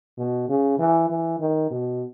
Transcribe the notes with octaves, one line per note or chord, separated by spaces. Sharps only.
B2
C#3
E3
E3
D#3
B2